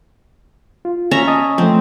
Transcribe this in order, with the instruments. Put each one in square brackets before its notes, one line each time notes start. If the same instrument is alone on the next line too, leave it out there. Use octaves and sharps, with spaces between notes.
[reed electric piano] F4
[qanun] C#4 E5 A#5
[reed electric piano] D#5 A5 D#6
[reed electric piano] F3 A3 [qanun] C4